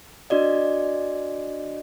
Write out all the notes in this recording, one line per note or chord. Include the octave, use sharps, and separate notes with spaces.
D4 F#4 D5 D#5